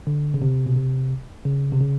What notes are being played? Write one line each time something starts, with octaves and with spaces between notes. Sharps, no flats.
D3
C#3
C3
B2
C3
C#3
C3
C#3